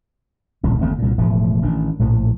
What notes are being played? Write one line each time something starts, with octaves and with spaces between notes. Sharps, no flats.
D#1 C2 A2
G1 D#2 A3 C4
C2 A#2
E1 A2 F3 A3
A1 D#3 D4
A#1 A2 F3